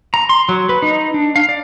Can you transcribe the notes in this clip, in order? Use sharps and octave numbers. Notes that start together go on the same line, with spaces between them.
A#5
C6
F#3
B4
D#4
D4
F5
D5